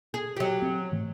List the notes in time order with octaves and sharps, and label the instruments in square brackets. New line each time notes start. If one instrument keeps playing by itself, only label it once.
[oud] G#4
F#3 G4
[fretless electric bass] C4
G#2 E3 A3